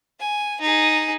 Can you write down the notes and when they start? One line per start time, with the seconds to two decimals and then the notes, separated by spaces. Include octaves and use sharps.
0.20 G#5
0.61 D#4 G#4